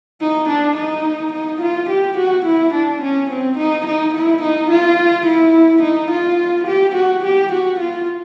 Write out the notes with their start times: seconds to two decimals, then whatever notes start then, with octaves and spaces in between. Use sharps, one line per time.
0.21 D#4
0.49 D4
0.77 D#4
1.33 D#4
1.62 F4
1.90 G4
2.18 F#4
2.46 E4
2.74 D4
3.02 C#4
3.30 C4
3.58 D#4
3.87 D#4
4.15 E4
4.43 D#4
4.71 F4
5.27 E4
5.83 D#4
6.11 F4
6.68 G4
6.95 F#4
7.24 G4
7.53 F#4
7.80 F4